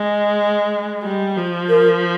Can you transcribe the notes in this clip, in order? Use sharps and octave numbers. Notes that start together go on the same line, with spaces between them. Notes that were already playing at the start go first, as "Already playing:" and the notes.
Already playing: G#3
G3
F3
A#4